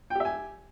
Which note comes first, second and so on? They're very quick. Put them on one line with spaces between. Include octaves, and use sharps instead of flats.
G5 G4 E5 G#5